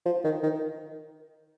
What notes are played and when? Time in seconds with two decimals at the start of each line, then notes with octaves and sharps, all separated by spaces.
0.06 F3
0.24 D#3
0.43 D#3